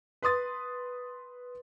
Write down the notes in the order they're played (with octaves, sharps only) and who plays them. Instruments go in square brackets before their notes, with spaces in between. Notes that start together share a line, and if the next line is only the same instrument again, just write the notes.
[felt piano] B4 C6 D#6 A6